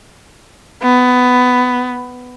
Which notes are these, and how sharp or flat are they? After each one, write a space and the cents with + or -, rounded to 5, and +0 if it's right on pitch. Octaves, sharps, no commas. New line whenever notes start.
B3 +15